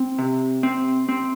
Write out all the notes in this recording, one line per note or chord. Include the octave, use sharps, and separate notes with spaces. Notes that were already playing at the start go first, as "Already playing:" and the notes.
Already playing: C4
C3
C4
C4